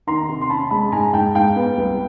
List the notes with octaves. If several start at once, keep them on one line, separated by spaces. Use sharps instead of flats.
D#3 A#5 C6
C3
C6
C#4 A5 B5
G#3 A5 B5
G#2 G#5 A#5
G#2 G5 A5
G#2 F5 G5
B3
C2